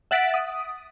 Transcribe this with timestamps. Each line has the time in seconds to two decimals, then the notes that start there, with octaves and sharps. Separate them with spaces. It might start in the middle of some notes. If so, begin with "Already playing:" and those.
0.11 E5 F#5 A6 B6 D7
0.34 D#6